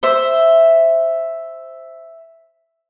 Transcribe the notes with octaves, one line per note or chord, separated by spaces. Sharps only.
C5 E5